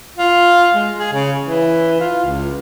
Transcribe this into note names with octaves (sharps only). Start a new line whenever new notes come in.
F4
G#3
G#4
C#3
E3
F4
C#2